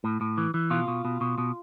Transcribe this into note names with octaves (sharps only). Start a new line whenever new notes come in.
A2
A2
E3
E3
B2 F4
B2
B2
B2
B2